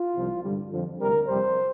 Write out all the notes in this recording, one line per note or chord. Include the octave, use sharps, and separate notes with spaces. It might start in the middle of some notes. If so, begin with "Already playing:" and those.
Already playing: F4
C2 C3 F3
G2 D3 G3
F2 D3 F3
D2 C3 G3 A#4
F2 C3 G3 C5